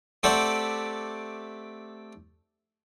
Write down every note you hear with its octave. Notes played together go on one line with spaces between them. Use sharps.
A3 C4 G4 D5 F#5